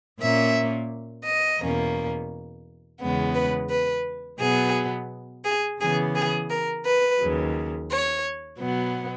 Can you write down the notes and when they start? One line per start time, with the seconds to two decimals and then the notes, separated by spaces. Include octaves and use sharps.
0.19 A#2 A#3 C#4 E5
1.25 D#5
1.60 E2 B2 A#3 C#4
3.00 E2 C#3 G#3 B3
3.34 B4
3.70 B4
4.39 B2 F#3 B3 G#4
5.45 G#4
5.80 C#3 E3 B3 G#4
6.15 G#4
6.49 A#4
6.85 B4
7.19 D#2 C#3 F#3
7.90 C#5
8.59 B2 F#3 B3